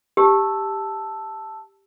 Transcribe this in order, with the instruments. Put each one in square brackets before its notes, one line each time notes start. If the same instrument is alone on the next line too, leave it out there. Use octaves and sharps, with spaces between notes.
[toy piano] G4 [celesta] A5 E6